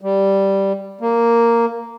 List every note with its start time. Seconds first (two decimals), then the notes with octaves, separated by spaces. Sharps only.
0.01 G3
1.01 A#3